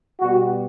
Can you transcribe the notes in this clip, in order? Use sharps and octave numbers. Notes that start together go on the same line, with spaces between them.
B2 G3 B3 F#4